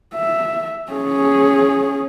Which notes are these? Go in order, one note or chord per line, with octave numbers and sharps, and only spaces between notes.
E5
C#4 G#4